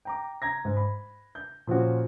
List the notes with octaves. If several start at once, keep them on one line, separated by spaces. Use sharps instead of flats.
G5 A#5 D6
A#5 G#6 A#6
G#2
B5
G6
A#2 F3 C#4 F#4